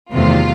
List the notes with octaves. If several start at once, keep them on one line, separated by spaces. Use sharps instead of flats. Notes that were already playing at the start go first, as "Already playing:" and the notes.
E2 C3 D#3 F#3 A3 F4